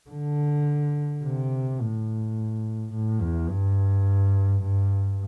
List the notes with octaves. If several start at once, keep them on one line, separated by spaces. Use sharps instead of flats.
D3
C3
A2
A2
E2
G2
G2